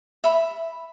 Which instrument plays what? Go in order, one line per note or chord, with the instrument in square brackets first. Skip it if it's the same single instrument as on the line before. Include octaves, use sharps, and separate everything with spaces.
[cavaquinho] E5 B5